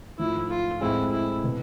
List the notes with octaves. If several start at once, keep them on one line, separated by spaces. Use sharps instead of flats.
G#2 F3 A3 E4
F4
A2 G#3 C4 E4 G#4
E4
B2 B3